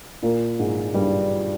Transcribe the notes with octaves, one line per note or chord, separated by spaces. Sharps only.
A#2 A#3
G#2 G#3
G2 G3